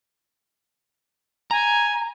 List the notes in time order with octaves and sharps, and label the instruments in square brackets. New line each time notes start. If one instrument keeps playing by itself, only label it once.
[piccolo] G#5 [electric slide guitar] A#5